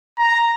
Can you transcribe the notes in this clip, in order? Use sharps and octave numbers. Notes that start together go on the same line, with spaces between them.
A#5